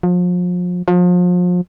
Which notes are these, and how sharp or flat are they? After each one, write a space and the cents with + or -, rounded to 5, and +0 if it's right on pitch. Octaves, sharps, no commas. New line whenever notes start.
F3 +35
F3 +35